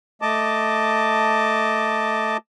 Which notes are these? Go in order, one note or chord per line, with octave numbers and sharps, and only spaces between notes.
A3 D#5 A5 D6